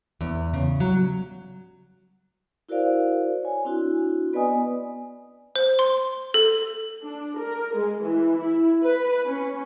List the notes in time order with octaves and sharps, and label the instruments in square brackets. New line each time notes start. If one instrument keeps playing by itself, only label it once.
[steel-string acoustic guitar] E2
C#3
F#3
[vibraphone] E4 F#4 A#4 C5 D5 F5
C#5 G#5
C4 D4 E4 F#4
B3 B4 D5 D#5 G#5 D#6
[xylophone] C5
C6
A4
[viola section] D4
A#4
G#3
E3
E4
B4
C#4